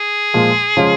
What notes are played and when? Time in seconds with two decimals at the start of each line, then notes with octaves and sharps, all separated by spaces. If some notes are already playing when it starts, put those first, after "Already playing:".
Already playing: G#4
0.34 A#2 F3 G#3
0.77 C#3 F3 G#3 C#4 F4